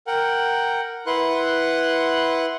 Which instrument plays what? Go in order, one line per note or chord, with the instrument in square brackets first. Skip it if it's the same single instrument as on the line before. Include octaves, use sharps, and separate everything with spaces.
[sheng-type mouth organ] A#4 F#5 G5
E4 B4 F#5 C6 F#6